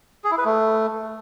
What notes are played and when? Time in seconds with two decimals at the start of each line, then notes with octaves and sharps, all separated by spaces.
0.24 G#4
0.31 E4
0.38 B4
0.45 A3